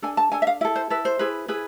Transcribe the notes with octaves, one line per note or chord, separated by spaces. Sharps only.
D4 A4 G#5
A5
D4 A4 G#5
E5
F5
E4 A4 E5
C5
E4 A4 B4
C5
E4 G#4 B4
E4 G#4 B4